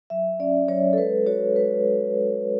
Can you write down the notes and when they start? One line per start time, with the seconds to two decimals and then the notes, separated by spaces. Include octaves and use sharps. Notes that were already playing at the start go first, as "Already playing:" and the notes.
0.10 F#3 E5
0.40 C#4 D5
0.68 F#3 C#5
0.93 A4
0.97 G#3 B4
1.26 F#4 C#5
1.56 G#3 B4